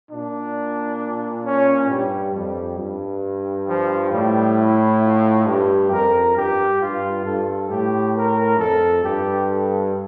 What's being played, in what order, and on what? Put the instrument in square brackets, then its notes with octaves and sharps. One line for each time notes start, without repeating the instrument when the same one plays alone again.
[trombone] A#2 [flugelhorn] D4
[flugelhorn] C#4
[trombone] G2 [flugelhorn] G3
[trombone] F2 [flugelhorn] G3
[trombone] G2
[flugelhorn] F3
[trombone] A2 [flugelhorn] G3
[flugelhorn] E4
F4
[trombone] G2 [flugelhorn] G4
[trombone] F2 [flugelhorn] A#4
[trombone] G2 [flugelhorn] G4
[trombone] G2 [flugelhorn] F4
[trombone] G2 [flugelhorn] A4
[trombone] A2 [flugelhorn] G4
[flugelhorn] A#4
[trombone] F2 [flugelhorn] A4
[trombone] G2 [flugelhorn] G4
[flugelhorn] A4